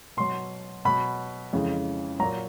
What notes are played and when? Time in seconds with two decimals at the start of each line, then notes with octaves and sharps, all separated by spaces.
0.17 B2 F#3 C6
0.85 B2 F#3 B5
1.53 F2 C#3 E3 G#3
2.20 F#3 A#5
2.23 A#2